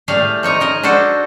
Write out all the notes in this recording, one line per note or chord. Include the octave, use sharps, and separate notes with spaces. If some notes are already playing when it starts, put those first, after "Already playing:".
A2 G3 A3 G#4 F5 G#5
F3 D#4 C#5 A#5
D#4 A#4 D#5
D4 F#4 A4 C5